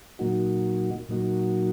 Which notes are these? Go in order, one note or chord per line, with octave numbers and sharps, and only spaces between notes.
A#2 F#3 A#3 D#4 F#4
A#2 F#3 A#3 D#4 F#4